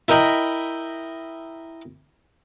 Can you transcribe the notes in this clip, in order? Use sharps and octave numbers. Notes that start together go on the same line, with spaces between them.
E4 A#4 D#5 G5 A#5 B5